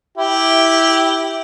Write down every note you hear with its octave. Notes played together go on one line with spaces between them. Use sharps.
E4 G4